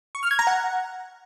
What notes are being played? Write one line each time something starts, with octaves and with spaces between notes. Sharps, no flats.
C#6
F6
G#6
A#5
F#5